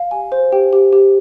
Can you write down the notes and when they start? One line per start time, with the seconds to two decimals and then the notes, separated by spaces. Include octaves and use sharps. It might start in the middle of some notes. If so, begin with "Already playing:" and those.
Already playing: F5
0.11 G4 G#5
0.32 C5
0.52 G4 G5
0.73 G4
0.93 G4